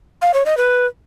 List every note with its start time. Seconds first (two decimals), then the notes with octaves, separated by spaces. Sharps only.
0.22 F5
0.34 C#5
0.45 D#5
0.57 B4